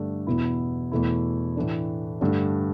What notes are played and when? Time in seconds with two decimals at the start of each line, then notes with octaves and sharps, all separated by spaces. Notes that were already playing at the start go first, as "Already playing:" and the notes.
Already playing: G2 D3 A3 D4
0.27 E2 B2 B3 E4
0.92 E2 B2 A3 E4
1.56 A2 E3 A3 D4
2.21 G2 D3 A3 D4